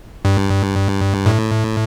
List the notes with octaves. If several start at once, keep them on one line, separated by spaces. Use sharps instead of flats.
G2
A2